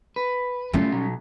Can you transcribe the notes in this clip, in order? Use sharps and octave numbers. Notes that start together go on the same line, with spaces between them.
B4
A2 G3 A3 C#4 F4
B2 F#3